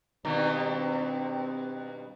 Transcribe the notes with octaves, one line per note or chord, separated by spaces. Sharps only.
G2 B2 D#3 C4